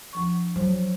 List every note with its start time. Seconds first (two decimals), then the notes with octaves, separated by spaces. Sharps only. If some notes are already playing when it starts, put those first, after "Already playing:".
0.13 D2 F3 C#6
0.56 F#3 C5